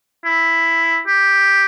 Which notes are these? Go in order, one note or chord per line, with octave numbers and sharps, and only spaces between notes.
E4
G4